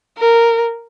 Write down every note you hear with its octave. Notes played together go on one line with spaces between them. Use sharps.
A#4